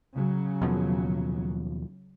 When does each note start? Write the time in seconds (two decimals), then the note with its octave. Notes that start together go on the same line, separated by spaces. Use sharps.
0.16 C#3 F#3
0.62 D#2 B2 F3